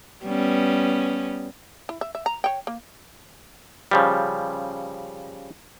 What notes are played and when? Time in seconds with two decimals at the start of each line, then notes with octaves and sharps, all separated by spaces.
0.24 G3 B3 C#4
1.89 E4
2.01 E5
2.15 E5
2.26 A#5
2.44 C#5 G5
2.67 A#3
3.91 C#3 F3 G3